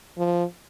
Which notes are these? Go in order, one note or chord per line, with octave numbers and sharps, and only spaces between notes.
F3